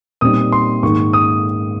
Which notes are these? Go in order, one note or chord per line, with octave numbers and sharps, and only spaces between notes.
A#2 G3 C4 D#4 D#6
C6
G#2 D#3 A#3 C#6
D#6